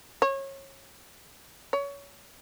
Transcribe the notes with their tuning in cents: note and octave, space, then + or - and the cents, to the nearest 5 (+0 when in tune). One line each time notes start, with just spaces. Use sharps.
C#5 -25
C#5 +25